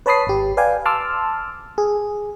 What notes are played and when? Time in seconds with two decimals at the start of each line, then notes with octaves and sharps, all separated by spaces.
0.06 B4 C#5 A5 B5 D#6 C7
0.27 G#1 G4
0.57 B4 D5 F5 G5 G#5
0.85 A5 C6 D6 E6 F6
1.78 G#4